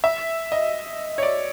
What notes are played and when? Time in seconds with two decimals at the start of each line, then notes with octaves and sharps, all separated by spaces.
0.04 E5
0.52 D#5
1.18 C#5
1.23 D5